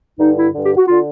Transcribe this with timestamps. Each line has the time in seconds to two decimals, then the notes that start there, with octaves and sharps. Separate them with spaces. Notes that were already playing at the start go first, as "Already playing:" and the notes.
0.19 G2 D3 D#4
0.37 E4
0.54 G2 D3
0.66 G4
0.77 F#4
0.88 D3 F4